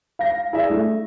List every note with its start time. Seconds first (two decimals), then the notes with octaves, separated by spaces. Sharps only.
0.19 F5 A#6
0.53 E4 G#4 D5 E5
0.70 A3